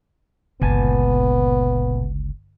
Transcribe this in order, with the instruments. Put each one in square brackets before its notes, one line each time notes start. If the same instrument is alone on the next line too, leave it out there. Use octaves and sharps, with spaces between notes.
[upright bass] G1 [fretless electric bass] C#2 [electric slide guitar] A#2 G#5 A5 [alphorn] B3